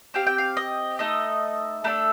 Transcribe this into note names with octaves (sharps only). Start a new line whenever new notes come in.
C4 G4 F5
G5
F5
D#5
A3 D#4 A4 D#5
A3 D4 A4 A#4